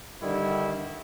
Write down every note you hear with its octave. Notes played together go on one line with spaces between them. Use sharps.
G2 D3 D#3 G3 E4